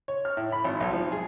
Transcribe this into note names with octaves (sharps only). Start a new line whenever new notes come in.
C#5
F6
A2
B5
G#1
B1
F3
G#4